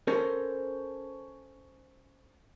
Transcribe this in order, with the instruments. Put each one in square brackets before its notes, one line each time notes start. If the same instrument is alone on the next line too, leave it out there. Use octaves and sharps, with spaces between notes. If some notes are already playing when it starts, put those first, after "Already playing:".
[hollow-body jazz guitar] C#4 A4 A#4 C5